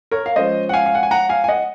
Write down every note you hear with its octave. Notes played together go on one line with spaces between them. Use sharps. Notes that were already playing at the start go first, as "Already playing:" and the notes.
A#4 C#5
F5
F3 G#3 C#4 C5 D#5
F#5
F5 G#5
F5
F#5
G#5
F#5 A#5
F5 G#5
G#5
D#5 F#5